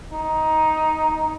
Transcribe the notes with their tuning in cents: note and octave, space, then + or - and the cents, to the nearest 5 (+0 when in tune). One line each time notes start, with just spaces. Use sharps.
D#4 +10